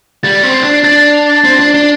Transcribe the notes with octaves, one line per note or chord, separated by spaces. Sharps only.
G3 A6
C4
C7
D4
D4 A6
F7
C4 C7
D4
D4 G7